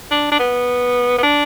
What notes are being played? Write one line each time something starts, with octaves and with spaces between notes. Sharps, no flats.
D4
D4
B3
B3
D4